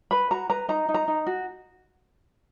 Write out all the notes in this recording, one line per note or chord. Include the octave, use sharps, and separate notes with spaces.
B4 B5
F#4 A#5
B4 A#5
D#4 A#5
D#4
A#5
D#4
F#4